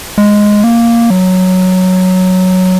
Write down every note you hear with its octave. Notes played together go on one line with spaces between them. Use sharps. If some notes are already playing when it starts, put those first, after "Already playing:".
G#3
A#3
F#3